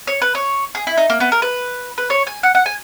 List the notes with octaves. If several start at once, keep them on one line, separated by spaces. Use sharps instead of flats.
C#5
B4
C#5
G#4
E4
D#4
A#3
B3
A#4
B4
B4
C#5
G#5
F#5
F#5
G#5